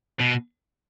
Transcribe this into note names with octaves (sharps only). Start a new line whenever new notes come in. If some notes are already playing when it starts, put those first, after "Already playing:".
B2